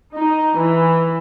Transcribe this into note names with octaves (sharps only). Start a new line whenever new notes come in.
D#4
E3